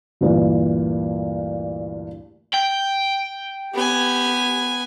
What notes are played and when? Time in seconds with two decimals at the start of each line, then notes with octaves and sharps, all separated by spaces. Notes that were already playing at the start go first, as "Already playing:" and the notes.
0.21 D2 G2 A#2 E3
2.53 G5
3.74 B3 G4 G#5